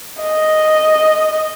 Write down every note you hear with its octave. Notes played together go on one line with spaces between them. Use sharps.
D#5